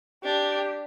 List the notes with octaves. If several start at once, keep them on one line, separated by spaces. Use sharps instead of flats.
D4 G4